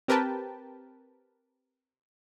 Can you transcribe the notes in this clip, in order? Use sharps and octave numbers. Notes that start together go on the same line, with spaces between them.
C4 G4 A#4 B4 G5 A5